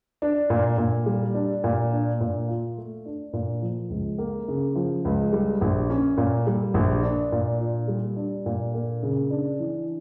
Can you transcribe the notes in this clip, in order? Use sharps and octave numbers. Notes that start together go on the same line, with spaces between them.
D4
A#2
A#2
G3
D4
A#2
D4
A#2
F4
A3
D4
A#2
F3
C#2
A#3
C#3
F3
C#2
G3
A#1
C#4
A#2
G3
A#1
D4
A#2
F4
G3
D4
A#2
A#3
C#3
D4
E3